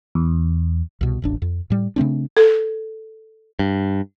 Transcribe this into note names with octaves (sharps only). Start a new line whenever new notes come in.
E2
C2 B2
E1 A1 D4
F2
A2 G3
C#3 A3 C4 D4
A4
G2